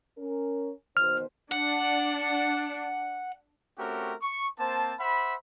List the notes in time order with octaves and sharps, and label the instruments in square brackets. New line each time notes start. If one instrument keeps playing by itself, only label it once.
[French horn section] C#4 A#4
[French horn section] B2 D#3 C5 [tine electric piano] F6
[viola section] D4 [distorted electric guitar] F#5
[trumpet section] A3 C4 C#4 F#4 G4 A#4
C#6
A#3 C4 C5 A5
C5 E5 F#5 B5